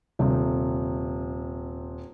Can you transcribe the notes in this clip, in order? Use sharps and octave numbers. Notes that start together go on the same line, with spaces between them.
D#1 C3